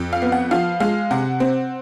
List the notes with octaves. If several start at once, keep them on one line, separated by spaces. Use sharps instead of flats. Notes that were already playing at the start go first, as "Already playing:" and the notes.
Already playing: F2
F5
B3
F#5
F3 F5
G#3 F5
C3 F#5
C4